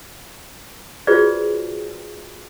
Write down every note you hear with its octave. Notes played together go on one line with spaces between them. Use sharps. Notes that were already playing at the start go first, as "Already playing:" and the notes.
F4 F#4 G#4 B4 C5 D5